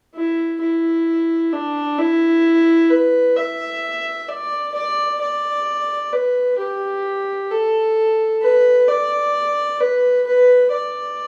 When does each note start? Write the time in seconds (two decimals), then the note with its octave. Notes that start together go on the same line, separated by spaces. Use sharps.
0.15 E4
0.60 E4
1.53 D4
1.98 E4
2.90 B4
3.36 E5
4.28 D5
4.74 D5
5.20 D5
6.12 B4
6.59 G4
7.51 A4
8.42 B4
8.88 D5
9.80 B4
10.26 B4
10.72 D5